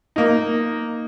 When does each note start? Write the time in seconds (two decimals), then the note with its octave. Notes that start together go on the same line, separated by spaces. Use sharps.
0.16 A#3 D#4